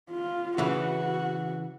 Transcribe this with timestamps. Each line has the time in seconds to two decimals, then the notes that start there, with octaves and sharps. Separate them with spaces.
0.11 F4
0.58 C#3 E3 F#4